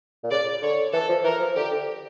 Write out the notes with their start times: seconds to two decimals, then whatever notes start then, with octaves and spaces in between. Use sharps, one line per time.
0.24 A#2
0.31 C#3 D5
0.62 D3 C#5
0.93 E3 A4
1.09 F3
1.24 E3 A#4
1.40 F3
1.56 D3 G4
1.72 D3